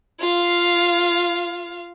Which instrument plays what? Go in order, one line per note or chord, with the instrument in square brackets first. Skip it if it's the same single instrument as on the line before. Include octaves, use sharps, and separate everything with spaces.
[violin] F4 F5